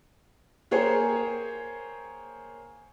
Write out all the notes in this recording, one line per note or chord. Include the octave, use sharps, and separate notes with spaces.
A#3 G#4 C5 C#5 G5 G#5